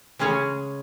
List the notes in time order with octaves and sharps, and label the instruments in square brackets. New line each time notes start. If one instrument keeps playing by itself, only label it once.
[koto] C#3 G#3 C#4 G#4 C#5